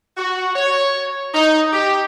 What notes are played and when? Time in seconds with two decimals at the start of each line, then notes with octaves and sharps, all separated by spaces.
0.17 F#4
0.56 C#5
1.34 D#4
1.73 G4